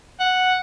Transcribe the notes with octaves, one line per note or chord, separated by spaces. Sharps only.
F#5